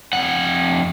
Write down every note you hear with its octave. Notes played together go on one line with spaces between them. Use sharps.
F2 F#5